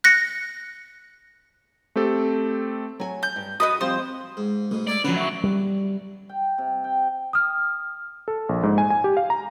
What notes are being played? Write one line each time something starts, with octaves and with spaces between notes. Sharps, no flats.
F#6 A#6 C#7
A3 C4 G4 A4
F#3 G#5
G6
G2
B3 F#4 B4 D#5 D#6
F3 G3 C4 C5
G#2
G#2 B2 G#3 A3
D#4 C#5 D5 E5
D3 F3 F#3 C#4 B4
E5 C#6
G3
G5
C3
G5
D#6 F6
A4
A#1
G#2
G#5
G#5
G4
F5
A#5